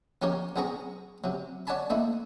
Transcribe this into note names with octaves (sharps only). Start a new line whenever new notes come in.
F3 C#4 G4 A#4 C#5 F5
B1 B3 C4 G#4 A#5 C#6
C3 F#3
C#5 D5 F#5 G#5 A5 B5
A3 A#3 D#4 E4